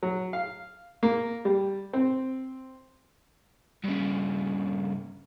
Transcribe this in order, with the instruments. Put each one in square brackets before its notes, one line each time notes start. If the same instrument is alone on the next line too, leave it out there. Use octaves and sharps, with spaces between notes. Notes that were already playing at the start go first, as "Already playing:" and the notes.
[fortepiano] F#3
F5
A#3
G3
C4
[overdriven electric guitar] G2 C#3